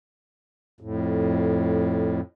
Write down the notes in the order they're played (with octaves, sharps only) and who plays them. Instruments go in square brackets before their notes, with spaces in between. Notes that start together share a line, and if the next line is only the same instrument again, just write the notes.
[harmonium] F2 A2